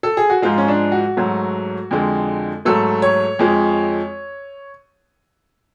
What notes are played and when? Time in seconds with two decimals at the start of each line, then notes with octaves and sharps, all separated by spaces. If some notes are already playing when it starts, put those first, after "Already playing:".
0.03 A4
0.17 G#4
0.30 F#4
0.42 G#2 F3 G#3 F4
0.58 C#4
0.68 D4
0.92 F#4
1.17 G#2 F#3 A3
1.91 F2 D3 G#3
2.65 G#2 F#3 A3 A4
3.02 C#5
3.39 F2 F3 G#3